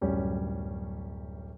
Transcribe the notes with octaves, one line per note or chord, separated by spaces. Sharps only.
D1 F#2 G3 C#4